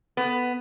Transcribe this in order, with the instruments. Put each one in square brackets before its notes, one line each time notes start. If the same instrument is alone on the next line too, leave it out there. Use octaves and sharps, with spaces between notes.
[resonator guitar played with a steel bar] B3